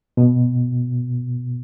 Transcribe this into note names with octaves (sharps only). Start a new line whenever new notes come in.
B2